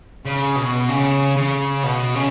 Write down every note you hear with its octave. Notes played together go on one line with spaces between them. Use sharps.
C#3
B2
C#3
C#3
B2
C#3